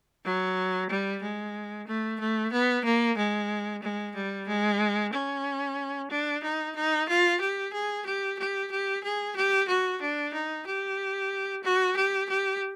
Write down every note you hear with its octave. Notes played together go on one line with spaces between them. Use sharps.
F#3
G3
G#3
A3
A3
B3
A#3
G#3
G#3
G3
G#3
C#4
D4
D#4
D#4
F4
G4
G#4
G4
G4
G4
G#4
G4
F#4
D4
D#4
G4
F#4
G4
G4